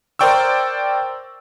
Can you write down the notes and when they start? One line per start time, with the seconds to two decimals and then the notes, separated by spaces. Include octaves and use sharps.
0.19 A#4 C5 D5 G5 C#6 E6